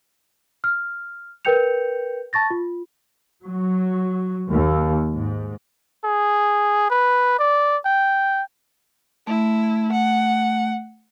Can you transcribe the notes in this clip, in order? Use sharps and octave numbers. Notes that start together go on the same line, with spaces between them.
F6
A#4 B4 G5 G6 C#7 F7
A5 C#6 A6 A#6
F4
F#3
D#2
G#2
G#4
B4
D5
G5
A3 E4
F#5